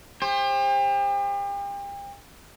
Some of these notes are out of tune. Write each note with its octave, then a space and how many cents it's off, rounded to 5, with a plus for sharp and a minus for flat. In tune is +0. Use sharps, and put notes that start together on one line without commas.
G4 +35 C5 +30